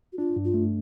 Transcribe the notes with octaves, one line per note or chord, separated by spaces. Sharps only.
F#4
D4 F4
G2
F4
A3